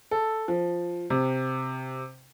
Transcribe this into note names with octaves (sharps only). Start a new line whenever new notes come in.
A4
F3
C3